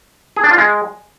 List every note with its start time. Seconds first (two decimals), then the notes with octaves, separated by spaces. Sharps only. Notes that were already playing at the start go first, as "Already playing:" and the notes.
0.36 G#4
0.44 D4
0.51 F4
0.58 G#3